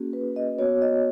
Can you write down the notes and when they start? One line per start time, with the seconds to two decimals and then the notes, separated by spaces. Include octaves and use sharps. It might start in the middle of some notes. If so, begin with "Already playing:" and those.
Already playing: A#3 C#4 F#4 G#4
0.13 B4
0.36 D#5
0.59 B3 F#4 C#5
0.82 D#5